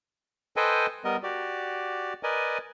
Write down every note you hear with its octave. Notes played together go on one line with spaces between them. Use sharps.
A4 B4 C5 D#5 G5 G#5
G3 B3 A#4 D#5
F#4 G4 D5
A#4 B4 D5 D#5 G#5